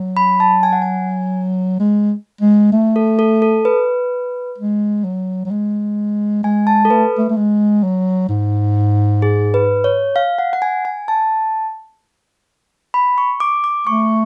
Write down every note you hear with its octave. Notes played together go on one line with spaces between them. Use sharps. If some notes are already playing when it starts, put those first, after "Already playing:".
Already playing: F#3
B5
A5
G#5
F#5
G#5
G#3
G#3
A3
A4
A4
A4
B4
G#3
F#3
F#3
G#3
G#3 G#5
A5
A4
A3 B4
A3
A3
G#3
F#3
G#2
G#4
B4
C#5
F5
F#5
F#5
G#5
G#5
A5
B5
C#6
D6
D6
A3 C#6